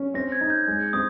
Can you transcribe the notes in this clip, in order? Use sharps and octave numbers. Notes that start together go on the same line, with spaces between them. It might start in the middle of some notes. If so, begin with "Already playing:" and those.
Already playing: C#4
C4 A#6
G#6
D#4
G6
G#3
C4 D#6